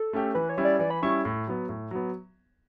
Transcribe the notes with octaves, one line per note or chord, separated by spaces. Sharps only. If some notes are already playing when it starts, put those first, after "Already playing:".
Already playing: A4
A3 C#4 G4
E3 B4
C#5
G3 C#4 E4
D5
E3 D5
B5
G3 C#4 E4 C#6
A2
F#3 B3
A2
F#3 B3